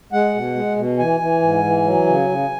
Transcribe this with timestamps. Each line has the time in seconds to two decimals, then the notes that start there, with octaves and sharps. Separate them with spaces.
0.13 G#3 F#5
0.34 B2
0.55 G#3
0.77 B2
0.98 E3 G#5
1.20 E3
1.42 G#2
1.64 E3
1.85 F#3
2.06 C#3
2.29 C#3